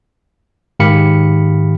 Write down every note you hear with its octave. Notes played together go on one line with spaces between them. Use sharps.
G#2 D#3 G4 F5 B5 C#7